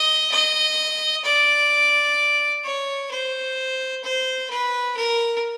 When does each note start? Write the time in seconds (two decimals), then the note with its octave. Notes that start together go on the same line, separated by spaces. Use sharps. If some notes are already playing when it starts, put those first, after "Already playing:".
Already playing: D#5
0.31 D#5
1.24 D5
2.64 C#5
3.11 C5
4.03 C5
4.50 B4
4.96 A#4